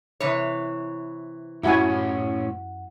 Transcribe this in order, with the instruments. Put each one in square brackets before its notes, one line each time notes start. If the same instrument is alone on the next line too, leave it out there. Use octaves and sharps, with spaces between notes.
[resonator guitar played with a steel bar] C3 E3 C#5
[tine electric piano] F#2 F#5 [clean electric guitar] A2 C#4 [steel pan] E4 F#4 G#5